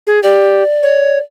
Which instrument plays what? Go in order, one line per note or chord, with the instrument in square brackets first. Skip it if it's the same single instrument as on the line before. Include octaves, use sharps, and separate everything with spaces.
[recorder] G#4
[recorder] G4 [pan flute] D5
[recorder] C#5